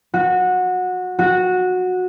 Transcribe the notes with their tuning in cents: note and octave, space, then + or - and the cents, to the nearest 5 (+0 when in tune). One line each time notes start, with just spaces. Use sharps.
F#4 -20
F#4 -15